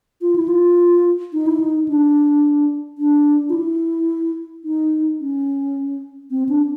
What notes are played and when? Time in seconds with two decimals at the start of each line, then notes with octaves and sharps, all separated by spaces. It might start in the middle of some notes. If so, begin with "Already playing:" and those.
0.22 F4
0.36 E4
0.48 F4
1.33 D#4
1.46 E4
1.60 D#4
1.88 D4
2.98 D4
3.49 F4
3.54 E4
4.64 D#4
5.20 C#4
6.31 C4
6.49 D4